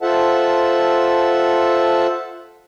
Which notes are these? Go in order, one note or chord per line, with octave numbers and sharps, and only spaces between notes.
F4 A4 C5 E5 F#5 A5